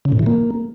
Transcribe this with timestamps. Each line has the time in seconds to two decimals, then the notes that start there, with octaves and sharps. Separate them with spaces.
0.05 C#3
0.12 A2
0.19 E3
0.26 A#3